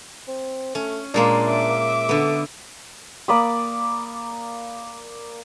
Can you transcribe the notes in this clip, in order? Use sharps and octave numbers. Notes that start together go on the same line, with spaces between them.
C4
A3 C#4
A#2 G#3 A#3 D4
E5 D6
D3 B3 A4
A#3 D5 B5 D#6